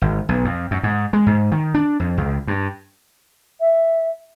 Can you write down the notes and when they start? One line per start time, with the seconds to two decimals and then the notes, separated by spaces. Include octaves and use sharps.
0.02 G#1
0.29 B1
0.45 F2
0.71 F#2
0.83 G#2
1.13 G#3
1.26 G#2
1.52 D#3
1.74 D4
2.00 F2
2.18 C#2
2.47 G2
3.60 E5